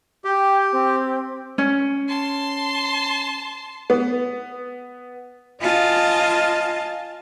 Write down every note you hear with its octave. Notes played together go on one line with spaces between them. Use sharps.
G4 G5
C4
C#4
A5 C6
B3
F4 D#5 G#5 A5